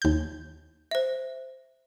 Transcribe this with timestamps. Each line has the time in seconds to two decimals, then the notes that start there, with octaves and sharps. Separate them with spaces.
0.02 D#2 G6
0.91 C5 E5